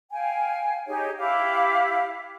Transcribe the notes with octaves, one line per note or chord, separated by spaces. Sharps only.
F5 G5 G#5
D#4 G4 G#4 C#5
E4 G4 F5 D6